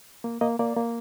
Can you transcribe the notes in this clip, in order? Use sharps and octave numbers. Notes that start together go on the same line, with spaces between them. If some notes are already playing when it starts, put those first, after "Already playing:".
A#3
A#3 D#5
A#3 D5
A#3